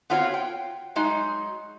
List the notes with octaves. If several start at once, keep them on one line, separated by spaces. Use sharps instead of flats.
B3 C4 F4 F#4 C#5
G5
F#3 G#3 D#4